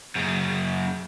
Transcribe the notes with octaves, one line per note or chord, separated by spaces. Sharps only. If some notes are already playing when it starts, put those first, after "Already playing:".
F#2 C#3